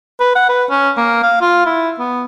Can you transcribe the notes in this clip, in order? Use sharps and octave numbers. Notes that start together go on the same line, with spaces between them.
B4
F#5
B4
C#4
A#3
F5
F4
E4
B3